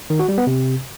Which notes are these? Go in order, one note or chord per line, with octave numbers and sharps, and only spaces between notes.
D#3
F#4
G3
B3
C3